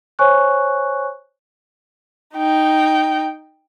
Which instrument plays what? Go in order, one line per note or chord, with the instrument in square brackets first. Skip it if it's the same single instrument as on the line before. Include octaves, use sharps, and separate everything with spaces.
[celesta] C5 C#5 G#5 C#6 F#6
[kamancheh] D#4 G5